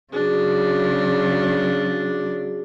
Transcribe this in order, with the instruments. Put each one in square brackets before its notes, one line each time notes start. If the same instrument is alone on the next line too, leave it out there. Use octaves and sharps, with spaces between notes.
[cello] C#3 F#3 [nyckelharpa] D4 [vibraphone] F#4 G#4